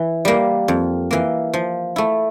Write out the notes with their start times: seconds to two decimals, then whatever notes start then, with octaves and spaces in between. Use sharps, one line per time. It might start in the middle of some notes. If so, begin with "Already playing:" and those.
Already playing: E3
0.25 G3 A#3
0.68 F2
1.11 E3 A#3
1.54 F3
1.96 A3 E4